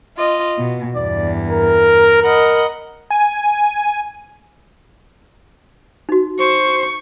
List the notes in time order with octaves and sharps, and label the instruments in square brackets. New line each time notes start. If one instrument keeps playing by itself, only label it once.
[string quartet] F4 D#5
B2
[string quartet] E2 G2 [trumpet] D5
[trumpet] A#4
[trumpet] A#4 [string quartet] D#5 F#5 B5
[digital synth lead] G#5
[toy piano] D#4 F#4
[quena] C5 [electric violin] C#6